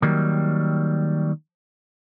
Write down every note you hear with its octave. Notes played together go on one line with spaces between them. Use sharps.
D#3 F#3 G3 A#3